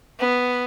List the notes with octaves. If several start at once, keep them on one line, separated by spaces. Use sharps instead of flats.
B3